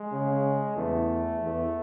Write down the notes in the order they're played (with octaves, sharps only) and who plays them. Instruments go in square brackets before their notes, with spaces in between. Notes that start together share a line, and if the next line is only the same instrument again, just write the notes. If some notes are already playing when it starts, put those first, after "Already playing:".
Already playing: [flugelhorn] G#3
[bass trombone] C#3
[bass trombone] E2 [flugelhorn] A3
[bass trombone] E2